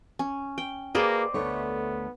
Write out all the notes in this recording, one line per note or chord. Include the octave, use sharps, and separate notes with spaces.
C#4
G5
A#3 F#4 G#4 B4 C5 D5 D#5
D2 A3 B3 C#5